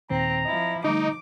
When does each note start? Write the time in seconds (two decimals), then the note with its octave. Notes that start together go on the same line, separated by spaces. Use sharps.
0.10 D#2 A#2 D#3 C4 A#5
0.45 F3 E4 D#5
0.84 D3 G3 A3 D#4 D6